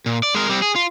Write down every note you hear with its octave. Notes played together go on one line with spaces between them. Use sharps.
A#2
D5
G#3 A#4
G3 C4
G#4
F4